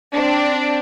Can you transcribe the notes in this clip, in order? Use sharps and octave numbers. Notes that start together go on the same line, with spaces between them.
C4 D4